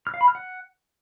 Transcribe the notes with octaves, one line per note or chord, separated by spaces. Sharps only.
F6
F5
B5
F6
F#5